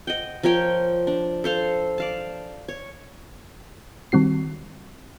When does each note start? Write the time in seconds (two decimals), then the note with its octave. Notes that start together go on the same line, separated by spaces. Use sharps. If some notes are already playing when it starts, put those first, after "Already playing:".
0.07 D#5 F#5 G5
0.43 F3 A#4 C#5 G5
1.07 D4
1.44 A4 C5 F5
1.98 D5 F5 A5
2.68 C#5
4.12 D#3 G3 C4 F#4 C7